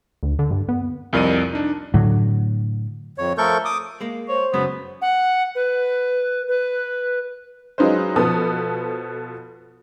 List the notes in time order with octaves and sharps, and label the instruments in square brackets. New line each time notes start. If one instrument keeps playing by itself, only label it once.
[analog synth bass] D2
D3
G2
B3
[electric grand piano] C2 F2 A#4 D5 D#5 D#7
D4 D#4
[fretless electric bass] A2 D3 F#3
[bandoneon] F2 C#5
F3 A3 A4 A#4 C#6 G6
D6 D#6
[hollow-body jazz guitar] G#3 A#3
[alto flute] C5 [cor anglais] C#5
[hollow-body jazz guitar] F#2 C#3 G#3 [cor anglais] B3
[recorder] F#5
B4
B4
[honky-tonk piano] F#3 G#3 D#4 F4 B4 C5
B2 F3 B3 A4 B4 D#6